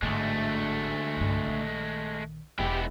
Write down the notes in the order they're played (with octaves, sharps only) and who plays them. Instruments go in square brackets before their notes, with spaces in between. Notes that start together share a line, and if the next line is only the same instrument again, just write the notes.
[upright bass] G#1 A2 [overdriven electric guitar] D2 [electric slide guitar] G#3 A3
[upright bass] C2 G2
A#1 D#3
[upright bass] E1 D4 [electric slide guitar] G#3 B3 E4 [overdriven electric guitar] G4 G5